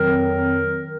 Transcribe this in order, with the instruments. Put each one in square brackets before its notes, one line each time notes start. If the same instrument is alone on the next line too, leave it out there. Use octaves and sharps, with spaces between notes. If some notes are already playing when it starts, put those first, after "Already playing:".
Already playing: [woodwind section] F2 D#3 F#3 C4 A#4